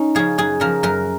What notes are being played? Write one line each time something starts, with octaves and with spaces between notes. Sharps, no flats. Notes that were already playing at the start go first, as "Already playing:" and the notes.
Already playing: C#4 D#4
C#3 F3 G#4
F#2 G#4
C#3 F3 A#4
F#2 A#4